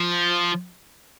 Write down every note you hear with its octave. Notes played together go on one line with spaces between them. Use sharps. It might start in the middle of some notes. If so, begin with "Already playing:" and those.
Already playing: F3